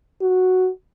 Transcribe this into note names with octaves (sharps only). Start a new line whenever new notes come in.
F#4